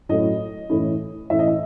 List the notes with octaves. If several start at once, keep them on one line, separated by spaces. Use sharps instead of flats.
A2 F#3 A3 C#4 E4 D#5
A2 E3 A3 C#4 E4
A2 E3 A3 C#4 E4 E5
D#5
E5